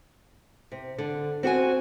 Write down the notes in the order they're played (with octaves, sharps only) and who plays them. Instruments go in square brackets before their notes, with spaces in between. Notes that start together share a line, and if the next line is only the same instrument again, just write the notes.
[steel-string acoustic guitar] C3
D3
C4 F#4 C#5 G#5